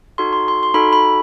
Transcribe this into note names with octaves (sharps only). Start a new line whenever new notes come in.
D#4 F#4 A4 C6
C6
C6
C6
D#4 F#4 A4 B5
B5